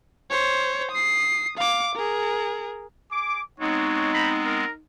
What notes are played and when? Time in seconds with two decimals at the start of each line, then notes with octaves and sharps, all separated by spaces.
0.30 C5 C#5
0.91 D#6 C7
1.57 F5 D6
1.95 G#4 A#4
3.12 G#4 D6
3.60 G#3 B3 C4 D#4 F#4 C#5
4.13 C5 A#5 B5
4.44 A#4